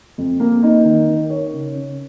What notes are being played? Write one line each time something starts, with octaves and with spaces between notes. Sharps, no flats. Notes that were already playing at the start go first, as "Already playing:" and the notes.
F2
A#3
D#4
D#3
A#4
C#5
C#3
C#4